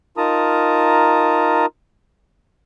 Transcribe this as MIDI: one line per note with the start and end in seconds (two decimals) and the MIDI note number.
0.17 1.66 63
0.17 1.66 65
0.17 1.66 70
0.17 1.66 81
0.17 1.66 82
0.17 1.66 87